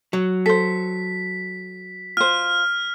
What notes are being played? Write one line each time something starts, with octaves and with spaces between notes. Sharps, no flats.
F#3
A4 C5 B6
F4 C5 F6